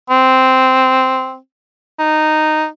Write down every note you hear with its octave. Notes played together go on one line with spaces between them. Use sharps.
C4
D#4